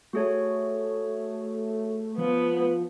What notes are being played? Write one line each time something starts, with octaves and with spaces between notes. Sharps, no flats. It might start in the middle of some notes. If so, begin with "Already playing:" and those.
A3 F#4 G#4 C#5
F3 B3